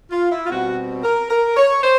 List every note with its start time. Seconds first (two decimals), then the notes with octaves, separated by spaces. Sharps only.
0.10 F4
0.29 E4
0.45 F4
0.50 B2 G3 C4 F#4
1.03 A#4
1.30 A#4
1.56 C#5
1.83 C5